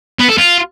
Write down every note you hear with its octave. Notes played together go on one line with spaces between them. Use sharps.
B3
A4
F4